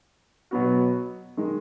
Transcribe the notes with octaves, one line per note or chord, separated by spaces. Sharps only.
B2 F#3 B3 F#4
D#3 G#3